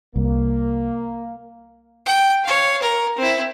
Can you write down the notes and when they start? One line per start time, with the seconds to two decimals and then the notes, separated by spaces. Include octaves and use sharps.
0.16 C2 A#3
2.06 G5
2.44 C#5 F5
2.82 A#4
3.18 C4 E4